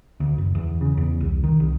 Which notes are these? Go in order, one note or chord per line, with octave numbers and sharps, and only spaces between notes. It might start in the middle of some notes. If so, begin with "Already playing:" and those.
D2
F#1
E2
C#3
E2
C2
D#3
C2